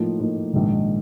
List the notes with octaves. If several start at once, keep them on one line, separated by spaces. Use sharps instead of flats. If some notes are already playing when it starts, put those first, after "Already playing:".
Already playing: A2 F3 A#3 D#4
A2 F3 A#3 D#4
A#1 G#2 D#3